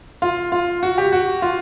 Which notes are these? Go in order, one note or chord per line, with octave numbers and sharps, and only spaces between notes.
F4
F4
F#4
G4
F#4
F4